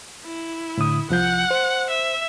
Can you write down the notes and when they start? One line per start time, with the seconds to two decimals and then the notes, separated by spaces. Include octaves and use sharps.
0.24 E4
0.78 A2 D3 D#6
1.10 C2 F3 F#5 G6
1.51 C5
1.89 E5